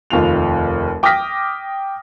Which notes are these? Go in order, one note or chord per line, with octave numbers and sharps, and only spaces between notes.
F1 D#2 F4 F7
G5 D6 D#6 F6 A#6 B6